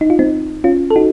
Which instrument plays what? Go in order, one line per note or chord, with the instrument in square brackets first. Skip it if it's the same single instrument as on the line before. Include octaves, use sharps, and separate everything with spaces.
[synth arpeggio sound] D#4
F4
C4 D#4
C#4 F4
A4
D#4 F#4